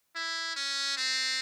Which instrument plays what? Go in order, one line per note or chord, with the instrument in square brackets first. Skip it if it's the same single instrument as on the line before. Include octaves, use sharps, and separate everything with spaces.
[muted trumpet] E4
C#4
C4